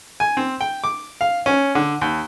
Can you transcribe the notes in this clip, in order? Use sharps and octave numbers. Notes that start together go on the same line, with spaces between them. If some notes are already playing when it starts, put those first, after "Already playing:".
G#5
C4
G5
D6
F5
C#4
D3
D#2